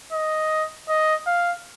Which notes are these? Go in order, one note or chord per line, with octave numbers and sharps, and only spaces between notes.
D#5
D#5
F5